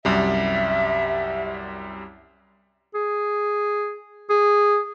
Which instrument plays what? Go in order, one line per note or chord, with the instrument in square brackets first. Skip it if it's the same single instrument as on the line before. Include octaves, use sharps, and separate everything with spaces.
[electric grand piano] C2 F#2 G3 [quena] E5
[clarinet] G#4
G#4